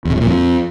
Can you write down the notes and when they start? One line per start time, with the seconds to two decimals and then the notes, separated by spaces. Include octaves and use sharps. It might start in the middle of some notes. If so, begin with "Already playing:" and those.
0.05 E2
0.11 C3
0.16 G2
0.21 A#2
0.26 F2